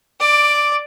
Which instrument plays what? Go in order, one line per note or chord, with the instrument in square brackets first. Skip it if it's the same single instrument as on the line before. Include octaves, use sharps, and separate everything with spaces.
[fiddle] D5 [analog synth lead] D6